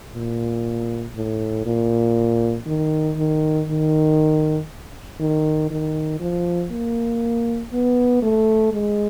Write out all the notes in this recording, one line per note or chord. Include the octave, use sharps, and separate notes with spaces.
A#2
A2
A#2
D#3
D#3
D#3
D#3
D#3
F3
A#3
B3
A3
G#3